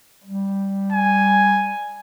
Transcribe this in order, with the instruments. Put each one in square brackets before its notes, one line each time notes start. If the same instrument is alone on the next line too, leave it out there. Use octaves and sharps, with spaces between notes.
[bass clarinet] G3
[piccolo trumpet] G#5